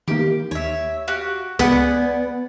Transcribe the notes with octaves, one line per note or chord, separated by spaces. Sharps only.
D#3 E3 A#3 G4
D#2 C#5 E5
F#4 G4 F5
C#2 B3 D5 F#5 G#5